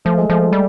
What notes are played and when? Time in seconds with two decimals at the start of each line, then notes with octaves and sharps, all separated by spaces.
0.05 F3 A3
0.18 G#3
0.30 F3 A3
0.53 G3